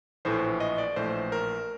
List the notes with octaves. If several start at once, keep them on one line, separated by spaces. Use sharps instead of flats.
A#1 A2 E3 A3 C5
D#5
D5
A#1 A2 E3 A3 C5
A#4